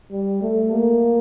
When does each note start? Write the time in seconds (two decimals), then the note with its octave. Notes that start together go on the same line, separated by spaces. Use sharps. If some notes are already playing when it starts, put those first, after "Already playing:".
0.12 G3
0.42 A3
0.72 A#3